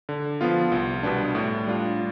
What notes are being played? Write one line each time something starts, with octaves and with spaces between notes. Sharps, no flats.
D3
F3 B3 F4
C2
B2 G3 B3 D4
A2
G3 D4 F4